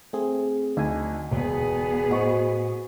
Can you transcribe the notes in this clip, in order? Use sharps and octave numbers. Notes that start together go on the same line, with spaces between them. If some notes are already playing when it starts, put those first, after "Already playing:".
A3 C4 G#4
D2 D#4 G#5
E1 B3 G#4
A2 F#4 C5 D#5 C#6